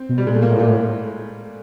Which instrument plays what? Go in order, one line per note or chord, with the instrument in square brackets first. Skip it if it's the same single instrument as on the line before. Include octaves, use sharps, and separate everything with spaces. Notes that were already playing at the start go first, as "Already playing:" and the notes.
Already playing: [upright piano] C4
[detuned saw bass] B2
[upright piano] G3
[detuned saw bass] A#2 [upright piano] G#3
[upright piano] A3
A#3
[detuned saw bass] A2
[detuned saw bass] A#2 [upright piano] A3
[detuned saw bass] A2